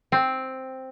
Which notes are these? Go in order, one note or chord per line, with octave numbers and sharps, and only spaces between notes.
C4